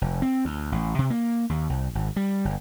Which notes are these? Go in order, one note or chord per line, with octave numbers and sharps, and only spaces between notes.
F1
C4
D2
A1
C3
A#3
D#2
C2
G#1
G3
G1